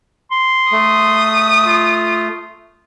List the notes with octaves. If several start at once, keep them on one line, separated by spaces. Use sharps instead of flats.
C6
A3 D#6
F4